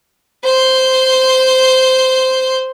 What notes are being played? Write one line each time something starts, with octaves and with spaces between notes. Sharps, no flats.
C5 C6